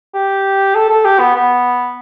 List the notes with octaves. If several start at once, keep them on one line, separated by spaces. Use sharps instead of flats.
G4
A4
A4
G4
B3
B3